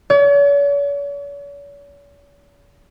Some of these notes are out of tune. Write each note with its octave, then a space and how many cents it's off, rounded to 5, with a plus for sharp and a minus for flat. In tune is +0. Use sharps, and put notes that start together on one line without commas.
C#5 +45